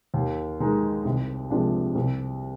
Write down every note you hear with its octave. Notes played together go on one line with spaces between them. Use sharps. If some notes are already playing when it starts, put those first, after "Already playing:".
D#2
D#3 G#3 D#4
C2
C3 F3 G#3 D4
C2